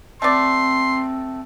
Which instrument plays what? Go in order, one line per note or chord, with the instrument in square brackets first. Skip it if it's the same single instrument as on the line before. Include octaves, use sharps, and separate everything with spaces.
[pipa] A3 D5 [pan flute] C4 [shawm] C6